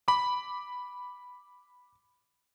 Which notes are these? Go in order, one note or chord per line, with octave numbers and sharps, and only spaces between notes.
B5 D6